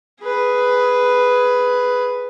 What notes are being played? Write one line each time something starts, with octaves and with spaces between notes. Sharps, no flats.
G#4 B4